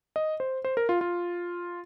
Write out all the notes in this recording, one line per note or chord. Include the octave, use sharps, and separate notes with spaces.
D#5
C5
C5
A#4
F4
F4